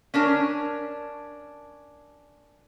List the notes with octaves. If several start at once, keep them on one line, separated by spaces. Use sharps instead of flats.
C#4 D4 A#4